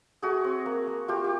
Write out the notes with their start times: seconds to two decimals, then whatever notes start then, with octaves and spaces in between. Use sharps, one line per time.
0.22 A3 F#4 G#4
0.44 C4
0.66 A#3
0.87 A#3
1.08 A3 F4 G4
1.24 G4